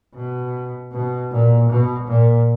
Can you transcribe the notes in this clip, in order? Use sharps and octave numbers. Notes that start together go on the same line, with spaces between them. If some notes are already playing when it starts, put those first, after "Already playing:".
B2
B2
A#2
B2
A#2